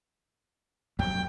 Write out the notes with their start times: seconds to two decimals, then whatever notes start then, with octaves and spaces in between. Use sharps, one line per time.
0.99 F2 F#3 G3 G5